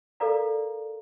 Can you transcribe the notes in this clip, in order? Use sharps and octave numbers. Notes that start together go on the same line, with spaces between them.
A4 A#4 D5 F5 A#5